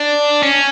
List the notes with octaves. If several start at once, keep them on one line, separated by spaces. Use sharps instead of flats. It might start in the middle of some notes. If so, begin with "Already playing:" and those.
Already playing: D4
C#4